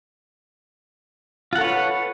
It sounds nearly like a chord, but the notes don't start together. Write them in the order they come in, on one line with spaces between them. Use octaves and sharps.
F4 F#5 A4 C#5 B4